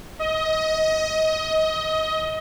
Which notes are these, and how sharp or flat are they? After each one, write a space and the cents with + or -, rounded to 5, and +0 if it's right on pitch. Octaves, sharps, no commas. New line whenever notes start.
D#5 +25